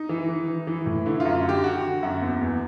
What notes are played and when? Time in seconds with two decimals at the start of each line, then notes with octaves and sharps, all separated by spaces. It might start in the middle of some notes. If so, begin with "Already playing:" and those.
Already playing: D#4
0.09 E3
0.29 E3
0.48 E3
0.67 E3
0.86 A2
1.06 D3 E4
1.20 F4
1.25 F#2
1.34 F4
1.44 D3 G4
1.63 D3 F#4
1.83 D3
2.03 F#2
2.21 E2
2.41 E2